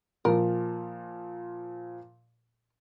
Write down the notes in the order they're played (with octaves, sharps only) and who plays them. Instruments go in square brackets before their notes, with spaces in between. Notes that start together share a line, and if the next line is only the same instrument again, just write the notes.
[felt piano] A#2 F3 [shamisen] A#4